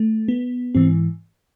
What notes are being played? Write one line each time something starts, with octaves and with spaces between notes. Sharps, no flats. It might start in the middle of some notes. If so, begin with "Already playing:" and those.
Already playing: A3
B3
G#2 E3 C4